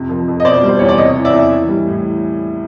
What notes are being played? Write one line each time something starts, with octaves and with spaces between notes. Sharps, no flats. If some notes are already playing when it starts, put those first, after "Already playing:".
Already playing: F2 C3
F3
F2
D#5
B2 C5 D5
G3
C5
E2 C#5
D5
C3 C#5 D#5
E3
D5 E5
E2
E3
G3
A2